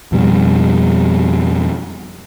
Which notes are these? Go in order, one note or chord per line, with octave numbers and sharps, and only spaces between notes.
F2 B2 G3